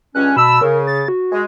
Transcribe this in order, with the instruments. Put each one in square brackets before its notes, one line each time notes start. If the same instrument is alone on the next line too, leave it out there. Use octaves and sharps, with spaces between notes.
[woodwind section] C#2 G2 C#4 [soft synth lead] F#6
[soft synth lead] B2 [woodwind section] A5 B5 E6
[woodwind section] C#3 [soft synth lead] A#4
[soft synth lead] A6
F#4
[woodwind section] G#3